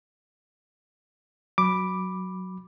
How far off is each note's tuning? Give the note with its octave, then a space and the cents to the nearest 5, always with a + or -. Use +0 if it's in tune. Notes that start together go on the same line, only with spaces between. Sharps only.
F#3 +0 B5 -5 D6 +0